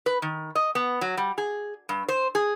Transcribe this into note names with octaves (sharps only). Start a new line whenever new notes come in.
B4
D#3
D#5
B3
F#3
G3
G#4
G2
C5
G#4